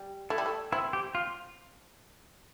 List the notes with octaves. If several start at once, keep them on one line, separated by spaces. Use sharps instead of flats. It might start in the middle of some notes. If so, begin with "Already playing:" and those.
Already playing: G3
A3 E4
G3
A3
C4 E4
G4
F4